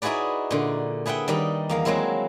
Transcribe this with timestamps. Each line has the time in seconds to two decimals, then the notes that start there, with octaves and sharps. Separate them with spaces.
0.02 D#4 E4 F#4 G#4 B4 D5
0.51 A#2 D3
1.06 G#4 B4 E5 F#5 G5
1.28 D#3 G3 D#4 D5
1.69 E2 A#3 F5
1.85 F#3 G#3 A#3 C4 E4